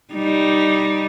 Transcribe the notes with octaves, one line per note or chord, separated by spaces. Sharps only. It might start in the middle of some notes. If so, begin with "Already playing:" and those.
G3 D#4